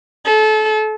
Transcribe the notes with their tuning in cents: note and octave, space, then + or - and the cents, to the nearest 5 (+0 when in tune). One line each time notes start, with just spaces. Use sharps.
A4 -30